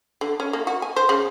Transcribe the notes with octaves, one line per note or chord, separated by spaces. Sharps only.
D3
C#4
A#3
F#4
G#5
C5
C#3